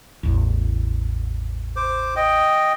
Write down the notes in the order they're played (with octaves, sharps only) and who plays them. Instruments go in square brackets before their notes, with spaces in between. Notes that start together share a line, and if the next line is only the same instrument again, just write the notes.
[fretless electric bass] A1 E2
[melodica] C5 D6
D#5 G5